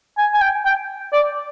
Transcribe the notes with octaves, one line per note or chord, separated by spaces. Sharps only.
G#5
G#5
G5
G5
D5